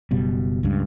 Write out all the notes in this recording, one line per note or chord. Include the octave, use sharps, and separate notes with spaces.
F#1 B2 G3
C#2 G2